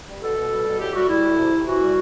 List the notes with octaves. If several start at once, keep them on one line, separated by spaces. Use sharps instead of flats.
G3
B2 A4
B2
G3
B2
A2 G4
G3 F#4
G3 E4
A2
C3
C3
E3 F#4
G3